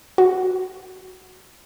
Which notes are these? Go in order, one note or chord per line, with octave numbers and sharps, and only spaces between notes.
F#4